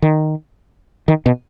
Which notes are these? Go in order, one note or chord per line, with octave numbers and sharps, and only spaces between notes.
D#3
D#3
B2